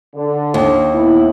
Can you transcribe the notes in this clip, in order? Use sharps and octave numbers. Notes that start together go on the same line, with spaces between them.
D3
D#2
B3 E4